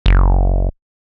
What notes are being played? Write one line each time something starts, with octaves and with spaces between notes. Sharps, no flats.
F#1